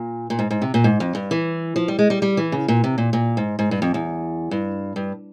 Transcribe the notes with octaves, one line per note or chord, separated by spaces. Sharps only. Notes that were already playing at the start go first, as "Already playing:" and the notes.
Already playing: A#2
A#2
G#2
G#2
C3
A#2
G#2
F2
G2
E3
F3
G3
G#3
G3
G3
E3
C#3
A#2
C3
A#2
A#2
G#2
G#2
G2
F2
E2
G2
G2